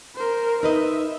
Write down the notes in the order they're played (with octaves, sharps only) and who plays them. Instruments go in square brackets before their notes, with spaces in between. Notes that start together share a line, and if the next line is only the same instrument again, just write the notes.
[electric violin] A#4 C5
[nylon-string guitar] D#4 B4 D#5 [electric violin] E5